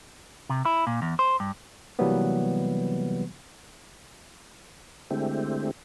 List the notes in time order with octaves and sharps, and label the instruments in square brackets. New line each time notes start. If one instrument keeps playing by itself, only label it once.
[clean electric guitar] C3
E4
A#2
E2
C5
G2
[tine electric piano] C3 E3 F#3 G3 A#3 B3
[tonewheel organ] D3 G#3 A3 C4 E4 G4